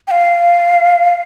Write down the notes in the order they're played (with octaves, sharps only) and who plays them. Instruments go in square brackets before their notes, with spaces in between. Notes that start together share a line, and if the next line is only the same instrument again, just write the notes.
[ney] G5
F5